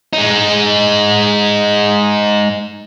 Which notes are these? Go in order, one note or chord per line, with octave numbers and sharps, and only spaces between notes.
G#3 D#4